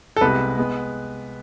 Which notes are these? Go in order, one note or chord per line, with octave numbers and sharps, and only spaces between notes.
A4
C2 C3 G#3 B3 B4
G#3 B3